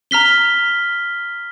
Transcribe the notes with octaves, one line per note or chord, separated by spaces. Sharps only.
A#5 F6 B6 G7